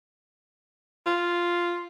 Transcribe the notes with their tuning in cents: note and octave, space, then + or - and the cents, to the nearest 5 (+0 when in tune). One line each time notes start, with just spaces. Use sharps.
F4 -5